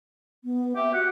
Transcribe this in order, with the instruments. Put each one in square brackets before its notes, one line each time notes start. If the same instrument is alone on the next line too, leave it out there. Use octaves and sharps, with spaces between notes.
[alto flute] B3
[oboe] G4 [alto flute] E5
[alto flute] F#4 [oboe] F#5